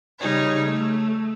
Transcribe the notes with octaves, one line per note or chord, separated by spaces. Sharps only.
C#3 G3 D#4 C#5
A3